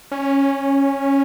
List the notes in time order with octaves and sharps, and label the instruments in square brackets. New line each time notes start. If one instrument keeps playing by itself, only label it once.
[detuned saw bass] C#4